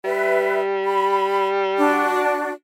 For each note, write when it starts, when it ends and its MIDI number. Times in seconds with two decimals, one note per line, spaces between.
0.04 2.29 55
0.04 0.61 71
0.04 0.61 76
0.85 1.47 83
1.78 2.51 62
1.78 2.51 66